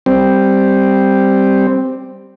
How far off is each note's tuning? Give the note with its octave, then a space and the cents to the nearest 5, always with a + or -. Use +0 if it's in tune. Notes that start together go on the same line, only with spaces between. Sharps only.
G3 +0 C4 +0